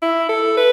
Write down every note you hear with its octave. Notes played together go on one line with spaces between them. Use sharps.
E4
A4
B4